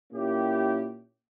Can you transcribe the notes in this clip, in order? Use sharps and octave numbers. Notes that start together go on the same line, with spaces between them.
A#2 A#3 C#4 E4 G4